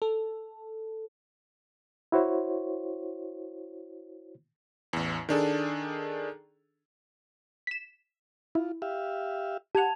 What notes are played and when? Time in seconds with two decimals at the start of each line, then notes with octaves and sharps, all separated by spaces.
0.02 A4
2.12 E4 F#4 C5 C#5
4.93 A1 E2
5.29 D#3 D4 G#4 A4
7.67 B6 E7
8.55 E4 F4
8.82 G4 E5 F5
9.75 G4 F#5 A5 G#6 F7